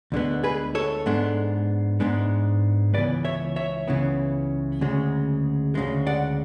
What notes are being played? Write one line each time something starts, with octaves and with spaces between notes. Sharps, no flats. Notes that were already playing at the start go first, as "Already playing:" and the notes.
D2 D3 G#3 B3
G#4 B4
A4 C#5
G#2 G#3 B3 D4
G#2 G#3 B3 D4
C#2 C#3 E3 B3 B4 D5
C#5 E5
C#5 E5
C#2 C#3 E3 B3
D2 C#3 G#3
D2 C#3 G#3
D5 F#5